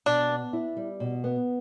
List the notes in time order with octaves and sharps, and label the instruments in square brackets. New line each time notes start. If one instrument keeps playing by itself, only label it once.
[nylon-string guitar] B2 [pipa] D4
[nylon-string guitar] B3
E4
G3
B2
B3